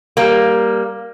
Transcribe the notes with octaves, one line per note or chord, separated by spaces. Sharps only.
G3 A#3